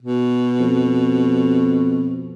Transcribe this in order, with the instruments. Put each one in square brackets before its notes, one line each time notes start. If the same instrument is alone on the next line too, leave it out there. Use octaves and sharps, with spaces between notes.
[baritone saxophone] B2
[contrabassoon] F2